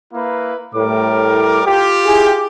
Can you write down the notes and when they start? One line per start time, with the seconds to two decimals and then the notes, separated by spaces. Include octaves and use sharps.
0.13 A#3 E4 B4
0.75 A2 G3 A#4 D6
1.66 F4 G4
2.05 E4 G#4